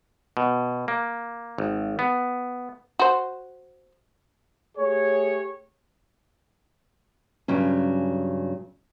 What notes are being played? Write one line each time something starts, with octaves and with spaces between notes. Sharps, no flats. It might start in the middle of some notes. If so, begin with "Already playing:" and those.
B2
A#3
G#1
B3
F#4 C5
A3 G4 G#4 C#5
G2 C#3 F#3 C#4